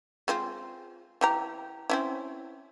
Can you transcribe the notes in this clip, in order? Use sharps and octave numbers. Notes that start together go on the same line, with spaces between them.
G#3 C4 F4
E3 G4 A#5
C4 C#4 E4